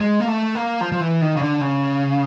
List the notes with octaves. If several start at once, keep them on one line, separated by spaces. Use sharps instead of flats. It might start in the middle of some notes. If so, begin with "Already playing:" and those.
G#3
A#3
A3
A#3
F3
F3
E3
D#3
C#3
D3
C#3